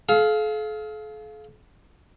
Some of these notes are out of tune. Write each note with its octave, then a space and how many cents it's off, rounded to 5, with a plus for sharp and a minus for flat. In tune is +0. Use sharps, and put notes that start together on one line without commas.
A4 -45 F5 +0